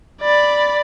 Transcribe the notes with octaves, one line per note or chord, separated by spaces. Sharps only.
D5 B5